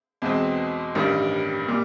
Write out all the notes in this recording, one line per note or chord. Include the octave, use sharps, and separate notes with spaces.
E2 B2 G#3 C4
A1 G2 D#3 G3
A#2 G3